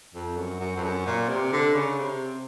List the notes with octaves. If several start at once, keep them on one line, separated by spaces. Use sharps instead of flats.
F2
F#2
F#2
F2
F#2
A#2
C3
D3
C#3
C3